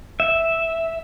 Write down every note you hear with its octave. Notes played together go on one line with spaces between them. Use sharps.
E5